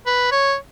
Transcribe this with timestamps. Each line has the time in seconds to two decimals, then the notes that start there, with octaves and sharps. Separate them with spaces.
0.06 B4
0.32 C#5